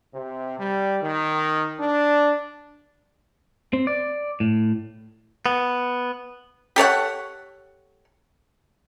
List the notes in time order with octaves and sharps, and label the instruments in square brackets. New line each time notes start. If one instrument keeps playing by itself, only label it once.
[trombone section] C3
G3
D#3
D4
[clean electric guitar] C4
D5
A2
B3
[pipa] G4 A4 C#5 F#5